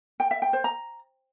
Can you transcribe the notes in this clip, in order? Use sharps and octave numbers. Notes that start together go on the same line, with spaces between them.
G5
E5
G5
C5
A#5